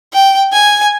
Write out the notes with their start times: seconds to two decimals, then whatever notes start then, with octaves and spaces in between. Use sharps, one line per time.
0.14 G5
0.53 G#5